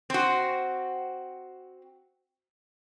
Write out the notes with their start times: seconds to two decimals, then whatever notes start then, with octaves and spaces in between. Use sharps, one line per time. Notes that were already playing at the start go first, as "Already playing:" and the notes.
0.10 C4 F#4